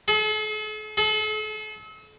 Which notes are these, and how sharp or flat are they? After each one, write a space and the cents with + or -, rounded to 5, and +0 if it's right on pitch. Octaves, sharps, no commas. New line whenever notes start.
A4 -45
A4 -40